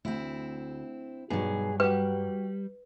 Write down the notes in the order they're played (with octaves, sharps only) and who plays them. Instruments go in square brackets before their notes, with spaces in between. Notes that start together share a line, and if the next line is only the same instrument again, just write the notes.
[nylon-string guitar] D2 [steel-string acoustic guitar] C4 E4
[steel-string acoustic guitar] G2 F#3 [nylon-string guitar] B2 B3 D#4 [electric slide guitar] G#4
[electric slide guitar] G3 [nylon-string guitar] F#4 G4 [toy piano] B4